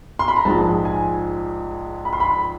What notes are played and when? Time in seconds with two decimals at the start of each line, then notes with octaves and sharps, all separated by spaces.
0.19 C6
0.28 B5
0.36 A#5
0.45 A#1 G#2 F3 G#3 A5
0.85 G#5
2.05 B5
2.13 C6
2.20 B5